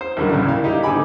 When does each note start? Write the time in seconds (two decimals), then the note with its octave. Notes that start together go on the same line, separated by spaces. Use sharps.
0.01 C5
0.17 D#2 A2 D3 F#3 G3 A#3
0.31 A#1 G2 C#3 D5
0.45 E4 F5
0.64 D#4 E4 G4
0.83 G#2 D3 G4 G#5 B5 D6